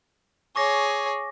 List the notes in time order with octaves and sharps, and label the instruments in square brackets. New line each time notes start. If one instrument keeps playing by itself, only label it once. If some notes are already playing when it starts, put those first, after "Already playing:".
[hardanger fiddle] G#4 C#5 [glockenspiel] C#6 D6 A#6